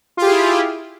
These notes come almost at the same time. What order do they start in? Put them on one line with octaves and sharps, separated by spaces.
F4 G4 G#4 E4